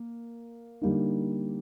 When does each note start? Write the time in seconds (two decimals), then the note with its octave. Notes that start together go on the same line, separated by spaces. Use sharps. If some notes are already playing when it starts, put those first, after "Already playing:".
Already playing: A#3
0.82 D3 G3 A#3 D#4